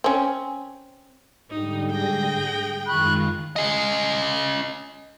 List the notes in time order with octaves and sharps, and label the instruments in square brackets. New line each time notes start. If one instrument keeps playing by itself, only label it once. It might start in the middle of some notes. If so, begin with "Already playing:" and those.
[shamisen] C4 C#4
[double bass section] G#2 D3 G3 [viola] D#4
[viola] G#4 G5 [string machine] A#6
[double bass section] F#2 [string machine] D#3 G#3 F4 [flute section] B5 C#6 F#6
[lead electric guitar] C#4 D#5